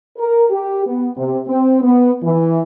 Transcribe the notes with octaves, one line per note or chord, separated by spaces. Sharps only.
A#4
G4
B3
C3
C4
B3
E3